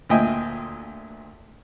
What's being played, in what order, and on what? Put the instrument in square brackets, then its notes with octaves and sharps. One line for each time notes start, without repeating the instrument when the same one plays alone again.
[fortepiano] D2 A#2 D#5 E5 G5 G#5